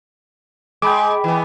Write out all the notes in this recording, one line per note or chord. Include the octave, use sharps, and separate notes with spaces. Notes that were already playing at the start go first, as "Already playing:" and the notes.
G#3 G5 B5 D6
E3 B3